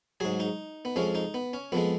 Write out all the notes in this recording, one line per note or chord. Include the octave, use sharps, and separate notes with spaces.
G#2 F#3 G#4
D#4
B3
F2 F3 G#3 C#4
D#4
B3
C#4
F2 F3 G#3 B3